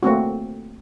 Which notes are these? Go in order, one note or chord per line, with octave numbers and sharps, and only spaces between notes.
A3 A#3 C4 F#4